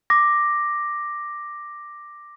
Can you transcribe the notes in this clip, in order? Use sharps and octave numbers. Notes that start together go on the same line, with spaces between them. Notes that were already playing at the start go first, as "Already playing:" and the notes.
D6 A#6